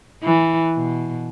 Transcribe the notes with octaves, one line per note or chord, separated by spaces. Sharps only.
E3
B2